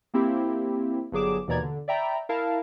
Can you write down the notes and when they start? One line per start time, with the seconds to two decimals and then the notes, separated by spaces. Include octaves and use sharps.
0.14 A#3 C4 E4 G4
1.12 G1 F#3 G#4 D6 E7
1.48 D#2 B2 E3 D5 A#5 G#6
1.62 D3
1.88 D5 E5 G5 A#5 B5
2.29 E4 A#4 F5 A5